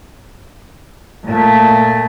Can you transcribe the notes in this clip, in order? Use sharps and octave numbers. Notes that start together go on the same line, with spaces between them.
A#2 A3